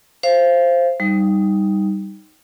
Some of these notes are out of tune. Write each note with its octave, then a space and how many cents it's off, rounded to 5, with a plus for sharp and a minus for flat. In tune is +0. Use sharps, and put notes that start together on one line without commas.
C5 +5 F5 -25
G3 +0 D#4 +0